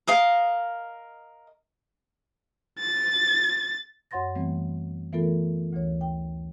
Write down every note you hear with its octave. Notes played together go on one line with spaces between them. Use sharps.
A#4 D#5 F5
A6
F#2 C#5 F#5 C6 A6 A#6
E3 G3 A3 B3 C4
E3 A3 B3 F4 A4 A#4
D2 E3 C#5
G5